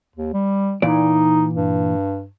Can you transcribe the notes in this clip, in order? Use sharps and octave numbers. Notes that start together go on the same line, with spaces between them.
D#2
G3
A#2 E3 D#4 D5
G2